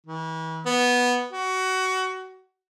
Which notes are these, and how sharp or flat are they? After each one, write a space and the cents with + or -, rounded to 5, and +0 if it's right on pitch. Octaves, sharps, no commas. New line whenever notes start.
E3 -40
B3 -5
F#4 +20